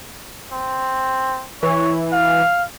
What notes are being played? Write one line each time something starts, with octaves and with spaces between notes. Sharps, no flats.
C4
E3 C#5
F5